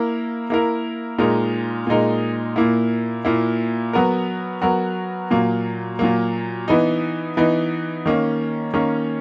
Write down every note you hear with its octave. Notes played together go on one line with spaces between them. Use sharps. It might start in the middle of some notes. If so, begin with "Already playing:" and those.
Already playing: A#3 E4 A#4
A#3 E4 A#4
A#2 G#3 D#4 A#4
A#2 G#3 D#4 A#4
A#2 A#3 E4
A#2 A#3 E4
F#3 B3 F#4 A#4
F#3 B3 F#4 A#4
A#2 F#3 A#3
A#2 F#3 A#3
E3 B3 D#4
E3 B3 D#4
D#3 A#3 C#4
D#3 A#3 C#4